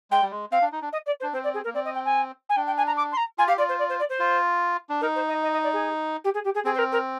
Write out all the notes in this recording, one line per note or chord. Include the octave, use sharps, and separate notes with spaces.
G#3 G5
G3
G#3
C4 F5
D4
D#4
D4
D#5
D5
C5
D4
C4 C5
D5
G#4
A#3 A#4
C4 D5
D#5
G5
G#5
G#5
D4 G5
G5
G#5
A#5
D6
C6
A#5
F4 G#5
G4 F5
F4 D5
C5
D5
C5
D5
C5
F4
D4
D#4 A#4
C5
D#5
D#5
D#5
D5
G#4
G4
G#4
G4
G#4
C4 G#4
C5
A#4
A#4